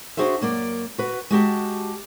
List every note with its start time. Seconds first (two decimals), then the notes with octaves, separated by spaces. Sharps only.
0.17 D4 F#4 G#4 C5 E5
0.41 F#2 A#3 D5
0.98 F#4 B4
1.30 G#3 F#4 G4 A5